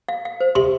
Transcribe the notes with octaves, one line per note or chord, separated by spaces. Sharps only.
F5
F5
C5
C3 C6